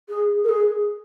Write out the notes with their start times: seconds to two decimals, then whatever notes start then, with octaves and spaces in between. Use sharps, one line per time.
0.09 G#4
0.44 A#4
0.49 G#4